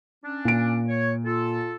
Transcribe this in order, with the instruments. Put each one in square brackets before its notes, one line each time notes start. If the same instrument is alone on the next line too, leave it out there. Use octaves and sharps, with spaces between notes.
[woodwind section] C#4 D4
[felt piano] A#2 D7
[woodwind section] C#5
F4 A4